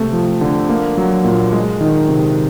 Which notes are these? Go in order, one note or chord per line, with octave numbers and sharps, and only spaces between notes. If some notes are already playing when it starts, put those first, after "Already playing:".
Already playing: C3 A3
F3
D3
A#3
F#3
A#2
G#3
D#3
C3